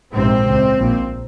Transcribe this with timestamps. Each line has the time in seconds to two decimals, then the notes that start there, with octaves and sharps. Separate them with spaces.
0.12 A#1 G#2 C3 C4
0.45 C#2
0.50 C3
0.78 A#1 A#2